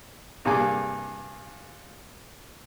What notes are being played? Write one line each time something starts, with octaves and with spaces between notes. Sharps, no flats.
G2 C3 A#3 G#4 G#5 D6